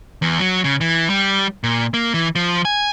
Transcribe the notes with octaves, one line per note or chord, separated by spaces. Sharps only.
E2
F#3
C#3
E3
G3
A#2
A#3
E3
F3
G#5